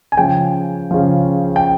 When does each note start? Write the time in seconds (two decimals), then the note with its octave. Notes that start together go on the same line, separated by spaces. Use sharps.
0.12 G#5
0.17 C#3 F3 G5
0.91 C#3 F3
1.56 G5